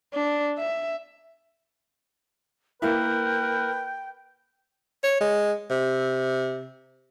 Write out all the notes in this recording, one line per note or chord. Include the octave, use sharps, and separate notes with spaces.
D4
E5
A#3 E4 A#4 B4 G5
C#5
G#3
C3